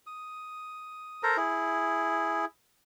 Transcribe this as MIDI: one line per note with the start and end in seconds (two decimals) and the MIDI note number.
0.07 1.23 87
1.23 1.37 69
1.23 1.37 70
1.23 1.37 72
1.23 1.37 82
1.37 2.45 64
1.37 2.45 68